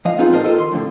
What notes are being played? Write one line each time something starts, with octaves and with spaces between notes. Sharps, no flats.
F3 D#5 F5
B3 C4 D#4 F4 G#4
A#2 A#4 C5 D#5 A5
F4 G4 A4 A#4 C5 D#5
D#3 C6
F2 A2 D3